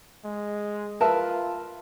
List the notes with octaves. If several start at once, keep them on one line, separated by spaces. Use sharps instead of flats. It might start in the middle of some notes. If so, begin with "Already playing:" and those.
G#3
F4 A#4 B4 E5 A5